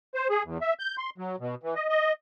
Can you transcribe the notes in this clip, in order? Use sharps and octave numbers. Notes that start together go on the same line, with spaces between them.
C5
G#4
E2
E5
G6
C6
F#3
B2
E3
D#5
D#5